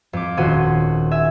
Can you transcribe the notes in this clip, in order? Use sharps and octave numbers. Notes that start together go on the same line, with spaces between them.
F2 D6
D#1 C#4 F4 F#4 C5 D#7
E5 G#5